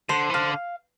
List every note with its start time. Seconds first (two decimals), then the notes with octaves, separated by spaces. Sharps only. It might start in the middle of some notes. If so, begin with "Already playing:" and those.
0.09 D3 C5
0.30 E3
0.34 D3 F5